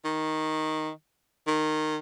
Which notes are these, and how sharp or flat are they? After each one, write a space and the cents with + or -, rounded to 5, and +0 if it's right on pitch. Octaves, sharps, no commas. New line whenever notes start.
D#3 +5
D#3 -10